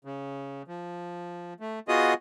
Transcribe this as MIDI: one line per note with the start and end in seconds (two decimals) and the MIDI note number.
0.05 0.62 49
0.68 1.54 53
1.60 1.79 57
1.88 2.14 59
1.88 2.14 65
1.88 2.14 66
1.88 2.14 68
1.88 2.14 75
1.88 2.14 87